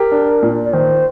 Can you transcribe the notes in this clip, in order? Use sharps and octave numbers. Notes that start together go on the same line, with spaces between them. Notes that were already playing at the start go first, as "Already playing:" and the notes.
Already playing: G4 A#4
D4
A#2
D5
D#3 C5